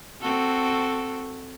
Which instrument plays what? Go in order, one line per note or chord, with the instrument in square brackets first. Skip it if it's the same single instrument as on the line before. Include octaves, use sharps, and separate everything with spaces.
[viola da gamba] C4 F#4 A4